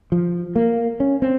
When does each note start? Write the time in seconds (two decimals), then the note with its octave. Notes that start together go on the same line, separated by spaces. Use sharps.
0.12 F3
0.56 A#3
1.00 C#4
1.22 C4